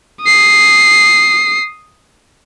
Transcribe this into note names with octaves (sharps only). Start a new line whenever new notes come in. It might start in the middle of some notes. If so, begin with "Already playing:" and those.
D#6 C7